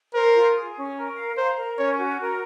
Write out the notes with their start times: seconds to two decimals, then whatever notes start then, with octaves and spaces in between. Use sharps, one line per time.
0.14 A#4 C5
0.35 F4
0.55 G#4
0.76 C#4
0.96 A#4
1.16 F5
1.37 C5 A#5
1.57 A#4
1.78 C#4 C#5
1.98 F#4
2.19 A#4